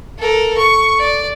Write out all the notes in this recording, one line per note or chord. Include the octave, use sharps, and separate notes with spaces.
A4 A#4
C#6
D5